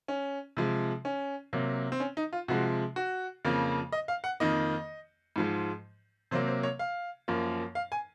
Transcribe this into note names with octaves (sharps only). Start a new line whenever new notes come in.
C#4
C3 F3 G#3
C#4
C3 F#3 A#3
C4
C#4
D#4
F4
C3 F3 G#3 F#4
F#4
F2 C#3 F3 A#3
D#5
F5
F#5
F2 D#3 A#3 D#5
G#2 F3 G#3
C3 F#3 A#3 C5
C5
C#5
F5
F#2 F3 A#3
F5
G#5